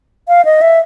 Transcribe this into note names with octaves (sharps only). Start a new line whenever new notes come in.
F5
D#5
E5